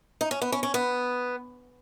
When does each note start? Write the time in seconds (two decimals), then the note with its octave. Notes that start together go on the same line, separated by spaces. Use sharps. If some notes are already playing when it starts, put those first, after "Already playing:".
0.21 D#4
0.31 C#4
0.42 B3
0.52 C#4
0.63 C#4
0.74 B3